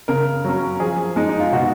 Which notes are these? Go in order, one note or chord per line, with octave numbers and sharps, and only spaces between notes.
C#3 A#4
F#3 C#4
F3 G#4
G#3 D#4
D#4
F4
B2 F#4